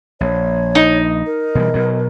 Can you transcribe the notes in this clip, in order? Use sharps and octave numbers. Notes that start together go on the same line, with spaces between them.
A#1 C#5
D#4
A#4
B2 E3 G3
B2 F#3